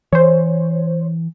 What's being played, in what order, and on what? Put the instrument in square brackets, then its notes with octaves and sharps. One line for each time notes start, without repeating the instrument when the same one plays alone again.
[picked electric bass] E3 [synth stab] C5 C#5